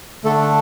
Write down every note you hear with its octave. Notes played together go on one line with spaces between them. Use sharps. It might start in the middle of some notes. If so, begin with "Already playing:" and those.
D3 A3 D4 A4